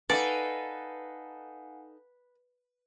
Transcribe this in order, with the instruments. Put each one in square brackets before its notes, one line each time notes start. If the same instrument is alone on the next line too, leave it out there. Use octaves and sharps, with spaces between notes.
[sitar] D#4 A4 [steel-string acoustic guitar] B4 [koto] D5 [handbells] F5 F#5 G#5